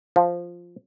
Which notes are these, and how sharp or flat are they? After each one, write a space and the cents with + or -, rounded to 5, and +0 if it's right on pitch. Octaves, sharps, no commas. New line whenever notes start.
F3 +0